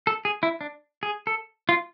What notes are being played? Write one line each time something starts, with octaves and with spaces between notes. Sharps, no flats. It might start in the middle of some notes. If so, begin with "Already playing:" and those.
A4
G#4
E4
D4
G#4
A4
F4